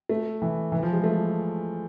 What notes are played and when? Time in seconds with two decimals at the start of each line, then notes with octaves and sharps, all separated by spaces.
0.09 A3
0.42 E3
0.72 E3
0.83 F3
0.93 G#3
1.04 A3